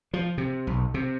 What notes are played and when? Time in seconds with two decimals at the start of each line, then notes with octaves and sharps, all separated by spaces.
0.14 F3
0.38 C3
0.67 B1
0.94 C3